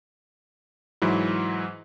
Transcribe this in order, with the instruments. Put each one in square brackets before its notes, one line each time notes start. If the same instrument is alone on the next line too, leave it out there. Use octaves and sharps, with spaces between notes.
[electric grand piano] G#2 E3 F#3 E4